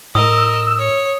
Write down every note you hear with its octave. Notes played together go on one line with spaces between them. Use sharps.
A2 A#4 D#5 D#6 E6
C#5